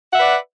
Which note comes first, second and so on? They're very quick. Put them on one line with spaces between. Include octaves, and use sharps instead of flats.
F#5 E5 B4 D5